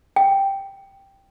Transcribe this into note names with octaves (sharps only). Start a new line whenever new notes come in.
G5